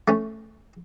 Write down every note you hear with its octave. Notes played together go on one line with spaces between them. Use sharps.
A3 C#4